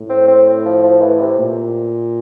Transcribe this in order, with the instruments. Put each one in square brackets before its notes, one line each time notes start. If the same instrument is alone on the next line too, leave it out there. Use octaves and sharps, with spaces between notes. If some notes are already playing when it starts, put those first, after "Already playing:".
Already playing: [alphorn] A2
[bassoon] C4
C4
F3
F3
E3
C3
[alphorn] A#2